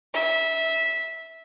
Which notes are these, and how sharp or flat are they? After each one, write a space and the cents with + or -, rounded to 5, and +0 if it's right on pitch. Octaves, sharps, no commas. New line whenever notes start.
E5 -15